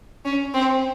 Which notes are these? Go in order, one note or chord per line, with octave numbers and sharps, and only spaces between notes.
C#4
C4